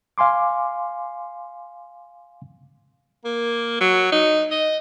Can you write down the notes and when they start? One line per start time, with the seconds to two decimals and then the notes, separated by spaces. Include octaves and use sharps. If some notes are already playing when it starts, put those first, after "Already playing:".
0.18 F5 G#5 C6 D6
3.24 A#3
3.80 F#3
4.12 D#4
4.51 D#5